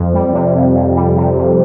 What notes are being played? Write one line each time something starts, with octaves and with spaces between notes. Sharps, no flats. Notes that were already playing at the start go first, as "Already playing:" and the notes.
Already playing: F2
G3
C3
F2
F2
G3
C3
F2